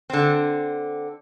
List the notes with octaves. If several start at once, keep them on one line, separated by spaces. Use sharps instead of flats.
D3 C4